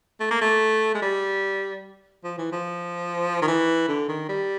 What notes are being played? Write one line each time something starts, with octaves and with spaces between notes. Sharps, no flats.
A3
A#3
A3
G#3
G3
F3
E3
F3
D#3
E3
D3
D#3
G3